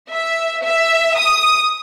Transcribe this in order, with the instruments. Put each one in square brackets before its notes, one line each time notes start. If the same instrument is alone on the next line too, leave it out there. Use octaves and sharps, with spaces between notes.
[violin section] E5
E5
D#6